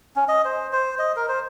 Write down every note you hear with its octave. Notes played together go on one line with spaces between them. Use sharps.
C#4
D#5
C5
C5
D#5
A#4
C5